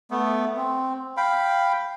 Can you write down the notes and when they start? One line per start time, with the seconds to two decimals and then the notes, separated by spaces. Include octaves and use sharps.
0.11 A3 B3
0.57 C4
1.17 F5 G5 B5